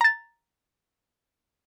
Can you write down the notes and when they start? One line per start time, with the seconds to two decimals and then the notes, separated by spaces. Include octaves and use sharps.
0.01 A#5 A6